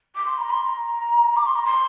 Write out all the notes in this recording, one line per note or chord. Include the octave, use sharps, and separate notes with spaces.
D6
C6
A#5
C6
C6
A#5
D6
C6
A#5
C6